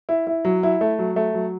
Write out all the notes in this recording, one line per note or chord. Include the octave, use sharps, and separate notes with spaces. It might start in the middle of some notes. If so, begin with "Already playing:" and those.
E4
E4
F#3
E4
A3
F#3
A3
F#3